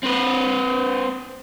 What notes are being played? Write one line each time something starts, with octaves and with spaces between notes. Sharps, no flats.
C4 B4